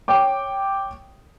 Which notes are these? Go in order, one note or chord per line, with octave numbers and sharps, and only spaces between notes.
C#5 G5 D6